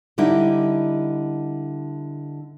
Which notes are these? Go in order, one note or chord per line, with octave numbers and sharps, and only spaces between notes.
D3 G3 D#4 E4